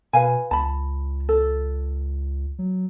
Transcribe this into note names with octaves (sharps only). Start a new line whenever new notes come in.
B2 B4 F5 G#5
C#2 A5 B5
A4
F#3